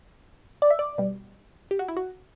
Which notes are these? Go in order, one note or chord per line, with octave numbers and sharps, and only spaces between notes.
D5
E5
D5
B2 G3
G4
F#4
E4
F#4